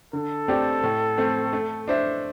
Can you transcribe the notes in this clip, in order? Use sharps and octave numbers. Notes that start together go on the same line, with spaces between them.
D3 A4
A3 C4 G4 D5
A2
A3 C4
A3
D4 C5 E5